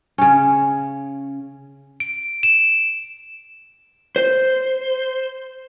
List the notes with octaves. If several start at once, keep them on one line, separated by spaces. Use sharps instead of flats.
C#3 C#4
D7
E7
C5